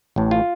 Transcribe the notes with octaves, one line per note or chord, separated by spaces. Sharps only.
A1 A2
F4